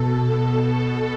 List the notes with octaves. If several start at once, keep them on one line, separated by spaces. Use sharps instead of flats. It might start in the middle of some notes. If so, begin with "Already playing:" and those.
Already playing: B2 A4